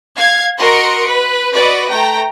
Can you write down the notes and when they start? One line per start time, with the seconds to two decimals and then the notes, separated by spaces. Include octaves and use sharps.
0.16 F5 G#6
0.58 F#4 A#4 D#5 C6 C#7 D7
1.07 B4
1.53 F#4 B4 D5 D#5
1.88 A3 G5 A#5